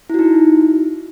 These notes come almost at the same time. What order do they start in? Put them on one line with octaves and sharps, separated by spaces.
E4 F#4 D#4